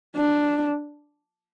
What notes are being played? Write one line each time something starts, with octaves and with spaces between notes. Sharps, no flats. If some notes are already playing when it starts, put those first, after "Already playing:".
D4